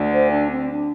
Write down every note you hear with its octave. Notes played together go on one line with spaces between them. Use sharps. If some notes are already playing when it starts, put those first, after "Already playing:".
Already playing: D2 D3
C5
D4
C4
D4